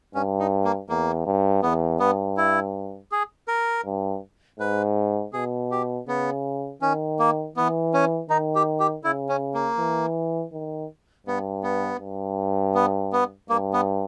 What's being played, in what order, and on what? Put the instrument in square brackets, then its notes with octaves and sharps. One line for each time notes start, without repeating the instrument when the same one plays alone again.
[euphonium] G2 [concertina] C#4
[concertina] D#4
A#3
[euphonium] E2 [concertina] A#3
[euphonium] G2
[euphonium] E2 [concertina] B3
[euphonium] G2 [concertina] B3
[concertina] E4
G#4
A#4
[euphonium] G2
[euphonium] G#2 [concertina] B4
[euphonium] B2 [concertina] G#4
[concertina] G4
[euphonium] C#3 [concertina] B3
[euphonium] D#3 [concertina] C#4
[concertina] A#3
[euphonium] E3 [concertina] B3
[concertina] C#4
[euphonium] D#3 [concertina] D#4
[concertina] G4
G4
[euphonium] C#3 [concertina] E4
[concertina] C#4
A#3
[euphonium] E3
D#3
[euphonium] G2 [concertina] B3
[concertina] B3
[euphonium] G2
[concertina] B3
B3
[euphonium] G2 [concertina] A#3
[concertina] B3